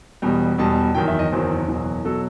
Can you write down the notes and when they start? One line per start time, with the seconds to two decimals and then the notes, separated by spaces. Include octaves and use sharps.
0.22 E1 E2 B2 G3
0.58 E1 E2 B2 G3 A5
0.95 F#1 E2 D#3 F#3 G5
1.08 E5
1.19 D#5
1.32 F#1 E2 D#3 F#3 C5
1.68 F#1 E2 B2 F#3
2.05 B2 F#3 A4